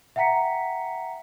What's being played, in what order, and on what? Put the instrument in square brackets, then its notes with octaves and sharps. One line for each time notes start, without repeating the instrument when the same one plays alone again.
[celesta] E5 F#5 G5 A#5 B6 C#7